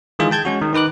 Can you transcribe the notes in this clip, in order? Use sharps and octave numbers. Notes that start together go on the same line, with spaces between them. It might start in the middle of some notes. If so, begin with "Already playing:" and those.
D#3 E3 G#3 F4 G#4
G5 A5 G6 G#6
G#3 C#4 F#4
D#3
D#3 D#4 B4 D6 F#6